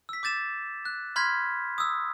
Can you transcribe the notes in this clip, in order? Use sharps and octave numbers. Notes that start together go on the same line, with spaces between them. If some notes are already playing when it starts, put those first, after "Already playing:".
E6 B6
D6 G6 A6 E7
F#6
B5 C6 F6 G6 G#6 B6
D#6 E6